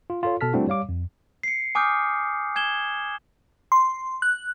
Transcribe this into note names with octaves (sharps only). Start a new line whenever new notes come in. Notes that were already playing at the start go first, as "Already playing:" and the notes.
F4
F4 A4 C#5
B2 A4 A5 F6 B6
G3 A3 C4 D4 E4 F#4
G3 C#5 F5 D6
F2
C7 C#7
G#5 D6 D#6 F6 G6
G#5 G#6 E7 G7
C6
F#6